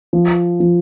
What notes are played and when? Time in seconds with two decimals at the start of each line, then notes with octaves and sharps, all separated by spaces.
0.13 F3
0.60 F3